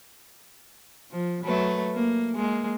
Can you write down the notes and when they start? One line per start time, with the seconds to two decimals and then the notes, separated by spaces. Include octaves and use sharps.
1.12 F3
1.44 F#3 A3 B4
1.94 A#3
2.36 G#3 A#3